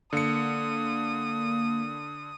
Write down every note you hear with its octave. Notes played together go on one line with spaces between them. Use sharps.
D3 A#3 D#6 C#7